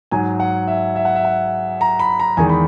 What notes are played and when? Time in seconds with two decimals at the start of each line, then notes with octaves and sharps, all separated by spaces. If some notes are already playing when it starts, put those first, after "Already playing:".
0.11 G#2 F#3 G#5
0.40 F#5
0.67 E5
0.96 E5
1.05 F#5
1.15 E5
1.25 F#5
1.81 A#5
1.99 B5
2.20 A#5
2.37 E2 D#3 G#3 G#5
2.49 B5